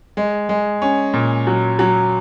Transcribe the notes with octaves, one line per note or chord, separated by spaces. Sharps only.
G#3
G#3
C#4
A#2
F#3
F#3